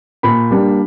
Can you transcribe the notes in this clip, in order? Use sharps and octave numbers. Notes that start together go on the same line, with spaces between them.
A#2 B5
G3 A#3 D4